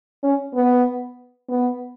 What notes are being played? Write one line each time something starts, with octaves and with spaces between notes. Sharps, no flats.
C#4
B3
B3